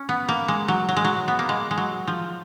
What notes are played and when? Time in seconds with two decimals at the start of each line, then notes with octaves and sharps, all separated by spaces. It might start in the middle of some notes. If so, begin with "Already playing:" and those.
Already playing: C#4
0.09 B3
0.29 A#3
0.48 G#3
0.68 F#3
0.89 F#3
0.97 G#3
1.04 F#3
1.28 B3
1.39 A#3
1.49 G#3
1.71 G#3
1.78 F#3
2.07 F3